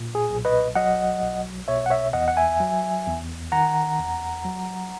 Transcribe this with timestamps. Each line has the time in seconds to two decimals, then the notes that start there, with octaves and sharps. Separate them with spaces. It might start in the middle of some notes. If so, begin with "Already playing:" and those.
Already playing: A#2
0.15 G#4
0.30 B1
0.45 B4 D#5
0.75 F#3 D#5 F#5
1.22 B1
1.68 B2 C#5 E5
1.86 F#5
1.90 C#5 E5
2.13 E2 D#5 F#5
2.28 F#5
2.37 E5 G#5
2.60 F#3
3.07 E2
3.52 D#3 F#5 A#5
3.99 E2
4.45 F#3